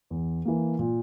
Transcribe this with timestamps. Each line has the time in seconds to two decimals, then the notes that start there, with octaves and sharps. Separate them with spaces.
0.10 E2
0.45 E3 A#3
0.79 A#2